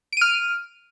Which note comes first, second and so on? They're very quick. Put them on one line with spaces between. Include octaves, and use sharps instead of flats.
D7 D#7 F6